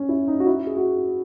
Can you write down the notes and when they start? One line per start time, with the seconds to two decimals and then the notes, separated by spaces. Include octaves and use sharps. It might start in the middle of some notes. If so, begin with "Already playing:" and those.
Already playing: C#4
0.09 E4
0.28 D#4
0.40 F#4
0.46 E4
0.67 G#4
0.76 F#4